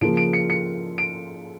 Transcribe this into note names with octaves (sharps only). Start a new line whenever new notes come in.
C#3 F3 A#3 D7
D7
C#7
C#7
D7